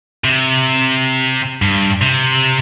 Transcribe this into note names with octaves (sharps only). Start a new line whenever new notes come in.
C3
G2
C3